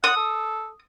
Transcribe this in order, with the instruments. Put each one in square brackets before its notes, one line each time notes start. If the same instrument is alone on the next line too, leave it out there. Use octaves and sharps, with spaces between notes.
[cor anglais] F#5 [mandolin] D#6
[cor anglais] A4